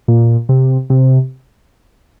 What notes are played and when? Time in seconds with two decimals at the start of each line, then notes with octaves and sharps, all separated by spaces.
0.08 A#2
0.49 C3
0.90 C3